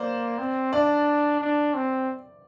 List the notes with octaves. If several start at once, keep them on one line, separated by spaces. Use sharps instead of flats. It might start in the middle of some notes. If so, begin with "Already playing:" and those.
Already playing: A#3 C5 D5
C4
D4 D5
D4
C4